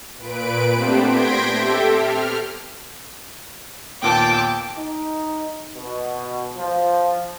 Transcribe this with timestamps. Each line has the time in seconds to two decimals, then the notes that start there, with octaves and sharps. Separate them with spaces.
0.18 A#2 B4 D7
0.71 A3 B3 C4 D4 G4 C5
1.06 C6 G6 G#6 A#6 B6 D7
1.52 G4 A4 E5
1.89 F6
4.03 D#2 A#2 B3 G5 A5 D6
4.77 D#4
5.76 B2
6.57 F3